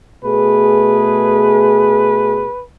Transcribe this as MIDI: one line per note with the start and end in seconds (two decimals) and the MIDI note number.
0.24 2.48 47
0.24 2.48 57
0.24 2.48 68
0.24 2.63 71